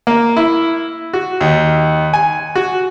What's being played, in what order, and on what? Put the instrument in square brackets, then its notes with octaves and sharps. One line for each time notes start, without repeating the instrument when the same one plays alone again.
[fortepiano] A#3
E4
F#4
D#2
G#5
F#4